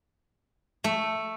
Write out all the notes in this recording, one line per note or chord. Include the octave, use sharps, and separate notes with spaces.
A3